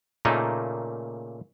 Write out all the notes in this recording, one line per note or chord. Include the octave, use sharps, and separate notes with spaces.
A#2 C#3 A3 A#3 D#4